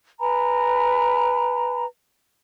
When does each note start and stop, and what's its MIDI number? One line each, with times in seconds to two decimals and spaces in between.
0.20 1.84 71
0.20 1.84 80
0.20 1.84 82
0.20 1.84 83